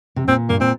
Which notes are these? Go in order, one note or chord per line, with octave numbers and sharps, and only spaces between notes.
C3
A#2 C4
G2 A#3
A#2 C4